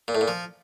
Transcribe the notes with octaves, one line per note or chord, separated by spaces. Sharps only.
A#2
A2
A#2
F3